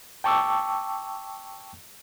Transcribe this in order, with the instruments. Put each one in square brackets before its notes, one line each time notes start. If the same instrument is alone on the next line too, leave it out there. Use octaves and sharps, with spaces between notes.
[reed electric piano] G5 A5 C#6 D6 E6